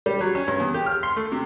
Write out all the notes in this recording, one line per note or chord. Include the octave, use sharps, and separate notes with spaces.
G3
F#3
C#4
G2
E2
G4
F6
C6
A3
C3